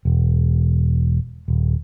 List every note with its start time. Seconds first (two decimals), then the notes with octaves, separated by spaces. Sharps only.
0.05 E1
1.48 D#1